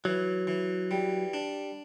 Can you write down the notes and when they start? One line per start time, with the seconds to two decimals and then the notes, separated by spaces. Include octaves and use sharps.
0.05 E3 F#3
0.47 E3
0.91 G3
1.34 D4